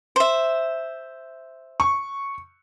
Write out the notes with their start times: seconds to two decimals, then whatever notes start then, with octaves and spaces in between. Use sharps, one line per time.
0.16 C5 E5
1.80 C#6